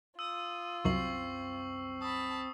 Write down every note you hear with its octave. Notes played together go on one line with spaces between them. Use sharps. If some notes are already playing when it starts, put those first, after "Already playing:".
F4 D#6 E6
C2 F#2 C4 C#6 C7 F#7
A5 B5 D#6